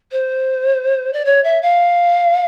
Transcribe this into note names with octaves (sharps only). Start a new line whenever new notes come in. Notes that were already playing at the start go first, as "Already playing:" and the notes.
C5
D5
C#5
E5
F5